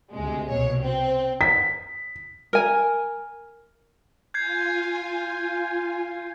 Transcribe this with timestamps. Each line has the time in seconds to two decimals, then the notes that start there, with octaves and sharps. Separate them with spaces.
0.13 D2 C3 G#3
0.49 C2 B2 C#5
0.81 C4
1.41 B6
2.53 A#4 G#5
4.34 F4 G#5 G6 G#6 C7